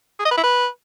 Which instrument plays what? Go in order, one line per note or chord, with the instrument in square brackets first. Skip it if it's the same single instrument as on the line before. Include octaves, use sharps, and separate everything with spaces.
[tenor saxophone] G#4
D#5
B4
E4
B4